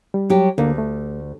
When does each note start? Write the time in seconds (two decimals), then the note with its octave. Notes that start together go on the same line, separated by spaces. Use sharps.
0.14 G3
0.30 F#3 G4
0.58 D2 D3 A#3
0.78 A3